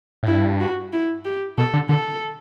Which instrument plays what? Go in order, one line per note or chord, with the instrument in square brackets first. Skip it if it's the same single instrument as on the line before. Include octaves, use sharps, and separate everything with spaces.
[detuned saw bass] A2
[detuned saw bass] G2 [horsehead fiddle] E4
[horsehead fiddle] F#4
E4
G4
[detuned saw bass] B2 [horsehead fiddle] A4
[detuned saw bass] D3
[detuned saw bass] D3 [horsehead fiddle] A4